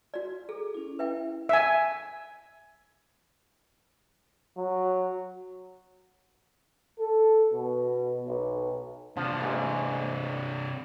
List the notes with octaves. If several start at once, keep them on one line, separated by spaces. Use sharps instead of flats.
F#4 D5
G#4 A4
C#4 E4
B4 E5 G5
E5 G#5
F#3
A4
B2
B1
C3 F3 D4
A1 G#2